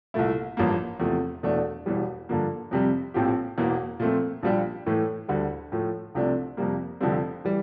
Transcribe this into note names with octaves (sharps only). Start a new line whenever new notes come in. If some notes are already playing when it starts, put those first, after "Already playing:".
C2 A#2 A3 E4
A1 G2 F3 A#3
E2 C3 F3 A3
E1 E2 E3 A3 D4
E1 E2 E3 G3
G2 D3 F3 A#3
F2 C3 G3
A#1 A2 F3 C4 G4
E1 E2 E3 A#3
A#2 F3 A3 C4
A#1 A#2 G3 D4 G4
A2 E3 A3
D2 D3 G3
A2 F3 A3
C2 C3 F3 A3 D4
F2 C3 G3 A#3
F1 F2 D3 G3 C4
E3 G3